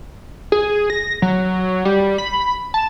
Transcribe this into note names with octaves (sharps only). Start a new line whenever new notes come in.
G#4
A#6
F#3
G3
B5
A5